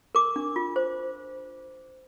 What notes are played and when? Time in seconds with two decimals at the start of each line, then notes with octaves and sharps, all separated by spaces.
0.15 A#4 D6
0.36 D4
0.56 F4
0.76 C5